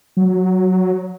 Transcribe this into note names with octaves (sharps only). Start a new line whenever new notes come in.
F#3